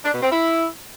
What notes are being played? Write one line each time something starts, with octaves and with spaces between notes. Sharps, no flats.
D4
B2
C4
E4